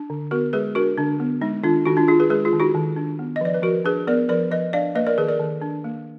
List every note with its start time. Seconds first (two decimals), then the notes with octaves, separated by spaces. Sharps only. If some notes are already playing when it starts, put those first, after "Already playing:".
Already playing: D4
0.10 D3
0.31 B3 F#4 A#4
0.53 G#3 G#4 B4
0.75 D4 F#4 A#4
0.97 D3 D4
1.20 B3
1.41 G#3 D#4
1.63 D#3 D4 F4
1.86 D#3 D#4 F#4
1.97 D4 F4
2.08 D4 F4 G#4
2.20 G#4 B4
2.30 G#3 G#4 B4
2.45 F4 G#4
2.53 D#3
2.60 D#4 F#4
2.75 D#3
2.96 D4
3.19 B3
3.36 D#5
3.41 F3 D5
3.54 B4
3.62 F3 F#4 A#4
3.85 D4 G#4 B4
4.07 B3 A#4 D5
4.29 F3 A#4 D5
4.51 F3 B4 D#5
4.73 D4 D5 F5
4.95 A#3 B4 D#5
5.07 A#4 D5
5.18 D#3 G#4 B4
5.28 A#4 D5
5.40 D#3
5.61 D4
5.84 A#3